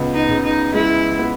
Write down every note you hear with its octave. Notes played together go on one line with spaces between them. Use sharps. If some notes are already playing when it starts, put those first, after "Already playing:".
Already playing: C#2 B3
D#4
C#3
D#4
G#3 E4
B3